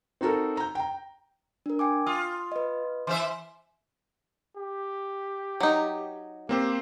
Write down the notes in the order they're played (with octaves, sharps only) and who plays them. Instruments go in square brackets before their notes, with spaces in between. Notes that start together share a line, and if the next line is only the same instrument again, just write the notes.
[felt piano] C4 D#4 F#4 A4 A#4
A#5 G6
G5 A#5
[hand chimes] D4 A#4
G5 G#5 D6
[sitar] F4 [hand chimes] D#6
[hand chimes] B4 D#5
[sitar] E3 C5 E5 [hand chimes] C6
[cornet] G4
[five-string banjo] F#3 D#4
[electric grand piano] A#3 C4 C5 [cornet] G4